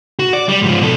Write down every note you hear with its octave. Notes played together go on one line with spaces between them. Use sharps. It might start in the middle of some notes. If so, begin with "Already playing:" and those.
F#4
D5
G3
G#2 F3
B2 A4